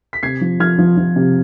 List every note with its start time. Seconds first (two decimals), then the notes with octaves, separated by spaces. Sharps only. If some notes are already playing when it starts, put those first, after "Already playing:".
0.13 B6
0.23 C3 G#6 C7
0.41 F3
0.60 F3 F6 G#6
0.79 F3
0.97 F3
1.16 C3